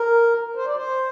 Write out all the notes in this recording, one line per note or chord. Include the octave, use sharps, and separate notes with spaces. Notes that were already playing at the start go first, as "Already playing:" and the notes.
Already playing: A#4
C5
D5
C5